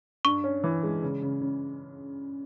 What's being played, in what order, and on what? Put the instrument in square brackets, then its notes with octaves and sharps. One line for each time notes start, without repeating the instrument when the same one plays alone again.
[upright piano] G2 [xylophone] C#6
[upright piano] C#4
E3
G#3
C#3
C#3
C#3